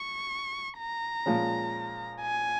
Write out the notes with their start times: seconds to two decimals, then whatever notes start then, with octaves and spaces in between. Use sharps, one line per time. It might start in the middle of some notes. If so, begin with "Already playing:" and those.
Already playing: C#6
0.79 A#5
1.26 A#2 F3 G#3 C#4
2.22 G#5